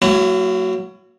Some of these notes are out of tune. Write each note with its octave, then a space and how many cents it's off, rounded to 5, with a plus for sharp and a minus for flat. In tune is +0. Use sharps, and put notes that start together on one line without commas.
F#3 +10 A#3 -30 E4 +35